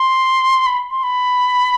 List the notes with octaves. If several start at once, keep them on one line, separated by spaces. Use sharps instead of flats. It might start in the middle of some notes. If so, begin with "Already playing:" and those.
Already playing: C6
B5
C6
B5